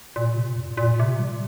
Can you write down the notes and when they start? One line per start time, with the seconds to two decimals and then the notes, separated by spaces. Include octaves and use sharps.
0.16 A#2
0.36 C3
0.57 F2
0.71 G2
0.77 A#2
1.00 C3
1.19 G3